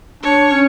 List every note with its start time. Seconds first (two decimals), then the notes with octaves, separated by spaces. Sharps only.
0.23 D4 C#5
0.52 C#4